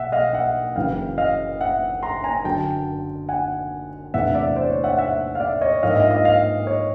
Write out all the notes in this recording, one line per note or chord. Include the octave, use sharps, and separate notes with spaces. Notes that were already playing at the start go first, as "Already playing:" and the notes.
Already playing: B1 E5 F#5
D#5 F5
E5 F#5
F#1 F#2 C#3 E3 F5 G5
D#5 F5
E5 F#5
A#5 C6
G#5 A#5
F#2 D3 F#3 G5 A5
F#5 G#5
E2 C3 E3 A3 D4 E5 F#5
D5 E5
C5 D5
C#5
E5 F#5
E5 F#5
F5
D5 E5
C#5 D#5
G#2 F3 A#3 D4 D#5 F5
E5
D#5 F5
D#5 F5
D#5 F5
C#5 D#5